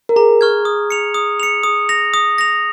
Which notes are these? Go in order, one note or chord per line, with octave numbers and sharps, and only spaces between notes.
A#4
G#4 A#5
C#6 F6 G#6
D#6
C#7 F7
D#6
C#7 F7
G#4 D#6
A#6 F7
D#6
A#6 F7